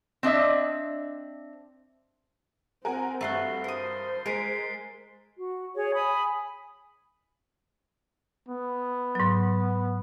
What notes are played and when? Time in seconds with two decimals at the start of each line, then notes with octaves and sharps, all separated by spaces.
0.23 C4 D4 D#5 E5
2.85 C4 A#4 F#5 G#5
3.21 G2 A3 F#4 F#5 A6 C7 G7
3.64 A#4 C5 D#6 C7
4.26 G#3 A#4 G#5 B6 C7 D7
5.38 F#4
5.76 G#4 C#5
5.94 G#5 B5 D#6
8.48 B3
9.15 G#2 F#3